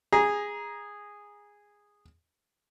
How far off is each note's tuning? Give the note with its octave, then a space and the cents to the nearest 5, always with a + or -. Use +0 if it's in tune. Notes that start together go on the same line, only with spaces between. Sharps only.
G#4 -10 A#5 +15